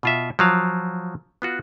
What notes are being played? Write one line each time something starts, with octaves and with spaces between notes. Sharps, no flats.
B2 F4 E5
F3 F#3 F5
B3 F4 F#4